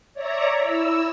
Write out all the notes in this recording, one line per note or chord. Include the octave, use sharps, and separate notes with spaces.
C#5 D5 E5 A#5
E4 E6